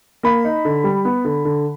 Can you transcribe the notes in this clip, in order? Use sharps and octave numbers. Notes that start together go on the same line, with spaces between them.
A#3 B5
D#4
D3
G3
B3
D3
D3